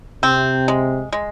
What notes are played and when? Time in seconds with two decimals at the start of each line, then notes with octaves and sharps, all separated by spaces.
0.22 C3 C4
0.68 G#3
1.12 G#3